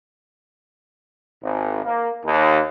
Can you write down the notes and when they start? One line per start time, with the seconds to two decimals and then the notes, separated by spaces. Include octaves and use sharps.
1.42 G#1
1.85 A#3
2.24 D#2